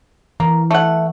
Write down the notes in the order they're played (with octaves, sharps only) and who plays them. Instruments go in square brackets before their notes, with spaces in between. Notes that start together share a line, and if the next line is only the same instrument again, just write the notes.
[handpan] E3 [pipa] A#3
[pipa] A3 F#5